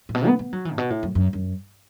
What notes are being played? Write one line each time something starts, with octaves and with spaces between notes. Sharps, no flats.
A2
B2
B3
B3
F#3
E3
A2
B2
A2
F#2
F#2
F#2